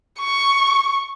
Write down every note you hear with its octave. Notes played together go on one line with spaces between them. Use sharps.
C#6